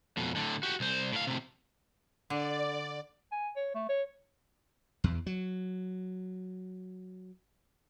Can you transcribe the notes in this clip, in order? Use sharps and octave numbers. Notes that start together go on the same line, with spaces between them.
F2 B2
A2 D3
F#4 G4
C2 C5
A2 F5
A2 C3
D3 D5
G#5
C#5
A3
C#5
E2
F#3